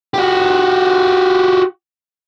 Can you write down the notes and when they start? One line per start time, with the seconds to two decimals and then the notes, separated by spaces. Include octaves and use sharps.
0.14 F#4 G4